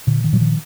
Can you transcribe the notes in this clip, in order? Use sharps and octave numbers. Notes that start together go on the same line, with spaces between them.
A#2 D3
D#3
A#2 F#3
D#3 F3